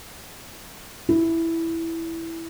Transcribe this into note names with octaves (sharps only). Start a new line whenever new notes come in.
E4